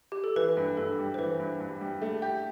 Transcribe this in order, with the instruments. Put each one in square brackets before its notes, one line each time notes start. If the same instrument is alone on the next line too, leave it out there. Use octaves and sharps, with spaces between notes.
[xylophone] G4
A4
[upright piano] E3 [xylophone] B4
[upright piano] G2
[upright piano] G2 [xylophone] A4
[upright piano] G3
[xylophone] C5
[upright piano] E3 [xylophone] B4
[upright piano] G2
G2
G3
A3
G4